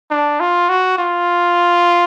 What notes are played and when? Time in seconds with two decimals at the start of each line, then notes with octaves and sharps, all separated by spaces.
0.11 D4
0.40 F4
0.69 F#4
0.98 F4